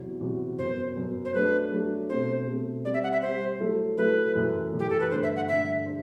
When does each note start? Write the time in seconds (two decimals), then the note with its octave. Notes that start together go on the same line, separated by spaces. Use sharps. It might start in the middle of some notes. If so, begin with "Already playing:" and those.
Already playing: E2 C3 F#3 C4 F#4
0.20 E2 C3 F#3 C4 F#4
0.58 F#2 F#3 B3 C5
0.95 F#2 F#3 B3
1.25 C5
1.34 F#3 A3 D4 B4
1.71 F#3 A3 D4
2.09 B2 A3 C4 C5
2.47 B2 A3 C4
2.84 G3 C4 G4 D5
2.94 E5
3.03 F#5
3.12 E5
3.22 G3 C4 G4 C5
3.60 F#3 A3 E4 A4
3.97 F#3 A3 E4 A4 B4
4.35 F#2 E3 A3
4.73 F#2 E3 A3
4.79 G4
4.90 A4
5.00 B4
5.11 G2 D3 A3 D4 C5
5.23 E5
5.36 F#5
5.48 G2 D3 A3 D4 E5
5.86 D4 C5